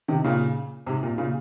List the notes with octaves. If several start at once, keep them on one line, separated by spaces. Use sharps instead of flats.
C3 D#3
A#2 C#3
G#2 C3
A#2
A#2 C#3